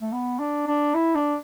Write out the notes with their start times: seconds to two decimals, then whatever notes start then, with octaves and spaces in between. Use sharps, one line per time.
0.02 A3
0.12 B3
0.40 D4
0.67 D4
0.95 E4
1.15 D4